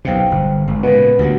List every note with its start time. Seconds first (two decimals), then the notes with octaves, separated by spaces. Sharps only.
0.05 B1 B2 C5 F5 G5
0.31 G1
0.68 G#1 G#3
0.83 A#2 C#3 B3
1.19 D2 A#2 C#3 F#4 G4 F#5